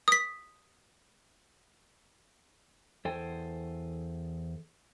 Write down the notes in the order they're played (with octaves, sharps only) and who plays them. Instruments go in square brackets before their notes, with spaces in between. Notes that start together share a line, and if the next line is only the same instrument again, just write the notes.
[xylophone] D#6 B6
[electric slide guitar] E2 A4 C5 G5 G#5